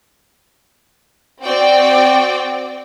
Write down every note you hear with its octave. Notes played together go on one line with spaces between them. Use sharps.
C4 F#4 D5 G5